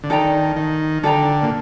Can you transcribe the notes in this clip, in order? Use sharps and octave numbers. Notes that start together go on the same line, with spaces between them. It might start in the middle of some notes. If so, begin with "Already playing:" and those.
D3
D#3 A4 D5 G5 A#5
D#3
D3 A4 D5 G5 A#5
A#2